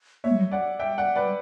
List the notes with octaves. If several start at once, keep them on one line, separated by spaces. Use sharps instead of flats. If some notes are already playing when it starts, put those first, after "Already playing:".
A#3 C#5 E5
G3
F#3
G3 D5 F#5
E5 G5
D5 F#5
B4 D5